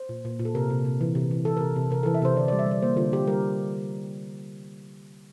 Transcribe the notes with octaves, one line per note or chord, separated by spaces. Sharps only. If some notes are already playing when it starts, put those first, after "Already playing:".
Already playing: C5
A#2
A#2
A#2
A4
C3 A#4
C3
C3
E3
C3
E3
E3 A4
A#4
C3
C3
C3 A#4
E3 A4
E5
C3 C5
D3 D5
D5
G3
E5
G3 D5
A#3 C5
D3 F4
D3 G4
G3 A#4